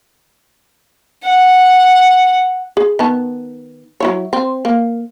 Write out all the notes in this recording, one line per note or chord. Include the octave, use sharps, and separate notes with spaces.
F#5
G#4
D#3 B3 A5
F#3 E4 C#5
C4
A#3